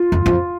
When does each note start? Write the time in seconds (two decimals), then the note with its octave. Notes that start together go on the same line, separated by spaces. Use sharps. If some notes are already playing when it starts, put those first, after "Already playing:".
Already playing: F4
0.12 F2
0.26 F2